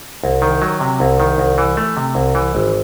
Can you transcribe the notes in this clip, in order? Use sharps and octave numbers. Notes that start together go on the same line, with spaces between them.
C2
D#3
F#3
C3
C2
D#3
C2
E3
A3
C3
C2
E3
G#1